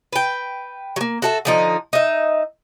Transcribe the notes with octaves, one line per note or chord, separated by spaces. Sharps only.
B4 G5
F#3 A#3
F#4 A4 E5
D3 F3 D#4
D#4 E5